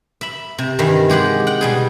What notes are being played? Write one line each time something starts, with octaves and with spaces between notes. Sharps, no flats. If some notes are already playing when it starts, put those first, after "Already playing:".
E5 B5
C3
G2 D#3 E3
G#3 G4 G#4 F#5
F#5 G5
B2 G3 G#4